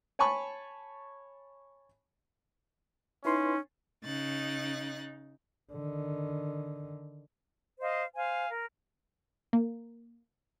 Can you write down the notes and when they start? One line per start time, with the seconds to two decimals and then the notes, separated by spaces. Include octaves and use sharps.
0.19 C#5 G#5 A5 B5 C#6
3.25 C#4 D#4 E4 B4 C6
4.05 C#3 D#4 F#6 A6
5.72 D3 D#3
7.80 C5 D#5 F5
8.15 C5 F5 G#5
8.49 A#4
9.53 A#3